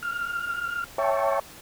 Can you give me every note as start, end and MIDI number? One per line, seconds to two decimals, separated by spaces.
0.03 0.84 89
0.98 1.39 73
0.98 1.39 76
0.98 1.39 79
0.98 1.39 81
0.98 1.39 85